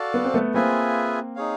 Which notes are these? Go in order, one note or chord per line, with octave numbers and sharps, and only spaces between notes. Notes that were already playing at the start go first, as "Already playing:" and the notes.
Already playing: F#4 A4 D5 F5 A5
B3
C4
A3 B3
A#3 C4 F4 G#4 B4 E5 G#5
D#4 G#4 C#5 F5